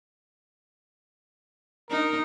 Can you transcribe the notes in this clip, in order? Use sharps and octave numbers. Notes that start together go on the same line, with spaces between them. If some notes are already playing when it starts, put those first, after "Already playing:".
D#4 A#4